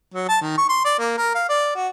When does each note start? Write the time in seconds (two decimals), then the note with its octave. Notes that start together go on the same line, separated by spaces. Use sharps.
0.14 F#3
0.29 A5
0.41 D#3
0.58 C#6
0.69 C6
0.85 D5
0.99 A#3
1.17 A#4
1.35 F5
1.49 D5
1.75 F#4